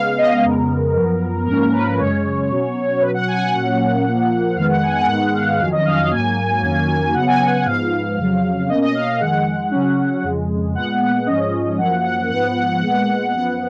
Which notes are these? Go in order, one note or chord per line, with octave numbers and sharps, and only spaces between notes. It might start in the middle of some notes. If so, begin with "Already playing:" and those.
Already playing: C#3 G#3 B3 F5
D#5
F2 C#3 G#3 B3 A#4
F#2 F3 B3
G#2 F3 A#3 C#4 A#4
B4
F#2 C#3 G#3 C#4 C#5
B2 F#3 C#4
B2 F#3 C#4 B4
F#5
G#5
F#5
A#2 F#3 A#3 C#4
A#2 F3 A#3
F2 D#3 G#3 B3 F5
F#5
G#5
F#5
G#2 D#3 G#3 B3 F#5
F5
F2 D#3 F#3 C#4 F5
D#5
F5
F5
G#2 F#3 A#3 G#5
F2 D#3 F#3 A#3 C#4
C#3 F#3 B3 F#5
G#5
F#5
F#5
G#2 F3 B3 F5
F2 C#3 F#3
B2 A#3 C#4 D#5
D#5
F5
D#5
F2 D#3 G#3 F#5
C#3 F#3 C#4
F2 C#3 G#3
A#2 G#3 B3 F#5
F#5
G#2 F3 G#3 C#4 D#5
F#2 F3 A#3 F#5
F#5
G#2 F3 B3 F#5
A#2 G#3 B3
F#2 F3 B3 F#5